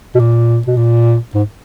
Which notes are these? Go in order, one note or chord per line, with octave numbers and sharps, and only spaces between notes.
B2
A#2
B2
A#2
G#2